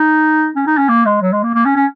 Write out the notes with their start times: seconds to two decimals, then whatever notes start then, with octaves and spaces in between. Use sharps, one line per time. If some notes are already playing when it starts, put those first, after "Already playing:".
Already playing: D#4
0.56 C#4
0.67 D#4
0.77 C#4
0.89 A#3
1.05 G#3
1.21 F#3
1.32 G#3
1.43 A#3
1.54 A#3
1.65 C#4
1.76 C#4